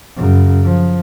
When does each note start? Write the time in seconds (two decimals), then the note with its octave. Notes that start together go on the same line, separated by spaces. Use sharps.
0.17 F#2 C#3
0.64 F3